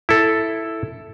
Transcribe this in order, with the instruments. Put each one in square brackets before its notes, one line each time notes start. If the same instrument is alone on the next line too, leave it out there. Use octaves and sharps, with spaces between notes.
[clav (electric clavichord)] E4 A4